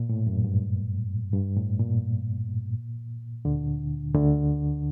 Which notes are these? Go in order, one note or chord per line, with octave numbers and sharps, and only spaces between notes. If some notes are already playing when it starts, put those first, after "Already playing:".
Already playing: A#2
A2
F#2
G2
G2
A2
A#2
D2 D3
D2 D3